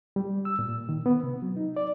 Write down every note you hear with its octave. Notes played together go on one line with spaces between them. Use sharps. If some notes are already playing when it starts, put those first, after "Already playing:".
G3
E6
A#2
D#3
B3
C3
F#3
D#4
D5